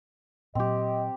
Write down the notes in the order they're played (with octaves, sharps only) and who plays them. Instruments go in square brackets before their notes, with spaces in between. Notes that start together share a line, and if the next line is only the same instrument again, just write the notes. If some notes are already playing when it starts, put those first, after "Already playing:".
[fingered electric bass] A#2 F#3 [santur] C4 G4 [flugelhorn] D#5